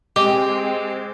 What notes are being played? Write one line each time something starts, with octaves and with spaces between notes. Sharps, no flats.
G#3 C4 G4 D#5 D6